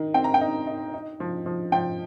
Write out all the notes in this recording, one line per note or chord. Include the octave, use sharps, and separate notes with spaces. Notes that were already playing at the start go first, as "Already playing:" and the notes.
Already playing: D#3 D#4
C4 G5
A#5
G5
D#4
D#4
D#4
F3
F3
F3 G5